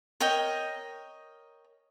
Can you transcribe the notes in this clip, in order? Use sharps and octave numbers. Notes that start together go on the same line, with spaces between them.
A#4 C#5 D#5 G5